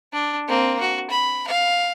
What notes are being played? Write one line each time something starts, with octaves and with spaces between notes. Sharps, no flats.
D4
A#3 C4
F#4
B5
F5